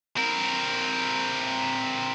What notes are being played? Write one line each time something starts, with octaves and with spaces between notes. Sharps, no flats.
C4 A#4